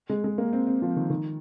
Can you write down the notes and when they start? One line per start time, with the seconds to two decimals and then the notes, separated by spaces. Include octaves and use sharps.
0.10 G#3
0.24 G#3
0.38 A#3
0.53 C4
0.67 C4
0.82 F3
0.96 D#3
1.10 D#3